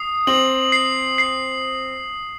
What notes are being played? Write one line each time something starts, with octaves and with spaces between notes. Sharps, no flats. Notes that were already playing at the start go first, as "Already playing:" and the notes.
Already playing: D#6 C7
C4 F#7
C7
C7